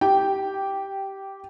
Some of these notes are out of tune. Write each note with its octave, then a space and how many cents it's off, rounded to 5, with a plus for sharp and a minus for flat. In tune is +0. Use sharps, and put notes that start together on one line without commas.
G4 -10 G5 +0